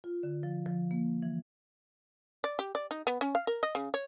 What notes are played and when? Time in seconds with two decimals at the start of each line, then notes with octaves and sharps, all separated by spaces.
0.04 F4
0.23 D3
0.43 F3
0.66 F3
0.91 A#3
1.22 E3
2.44 D5
2.59 G4
2.75 D5
2.91 D#4
3.07 B3
3.21 C#4
3.35 F5
3.47 A#4
3.63 D#5
3.75 C#3
3.94 C#5